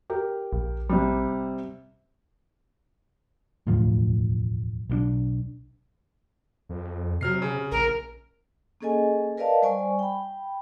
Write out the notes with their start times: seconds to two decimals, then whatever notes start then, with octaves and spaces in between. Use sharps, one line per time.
0.10 G4 A#4
0.53 A#1
0.89 C3 G3
3.67 E1 D2 A2 F3
4.90 B1 D#3 D4
6.69 F2
7.21 C3 F#3 F6 C7
7.42 C#3
7.72 A#1 A#4
8.81 A#3 C#4 G#4 A4 D#5 G#5
9.38 A#4 B4 D5 D#5 F5 A5
9.62 G3 C5 D5 G#5 C#6
9.99 G5 B5